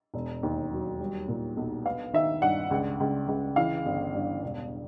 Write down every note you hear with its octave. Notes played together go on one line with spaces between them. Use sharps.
E1
D#2
F#3
G3
A#2
B1
B3 F5
D#3 E5
G2 F#5
C#2
C#2
C#2
E3 F5
G1
G2
E1